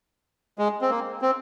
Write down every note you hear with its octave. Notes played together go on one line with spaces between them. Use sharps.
G#3
C4
A#3
C4